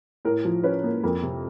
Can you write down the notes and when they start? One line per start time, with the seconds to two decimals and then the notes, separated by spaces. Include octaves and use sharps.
0.25 A2 A#4
0.45 F3
0.64 C#4 B4
0.84 A#3
1.04 F2 A#4
1.23 C3